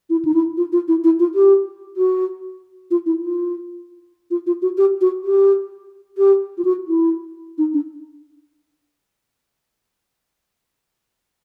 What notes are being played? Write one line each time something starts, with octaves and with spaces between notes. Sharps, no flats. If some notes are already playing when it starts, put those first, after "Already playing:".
E4
D#4
E4
F4
F4
E4
E4
F4
G4
F#4
F4
E4
F4
F4
F4
F#4
G4
F#4
G4
G4
F4
F#4
E4
D#4
D4